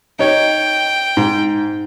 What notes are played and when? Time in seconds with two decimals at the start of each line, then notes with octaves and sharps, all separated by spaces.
0.19 D#4 C#5 G5
1.17 G#2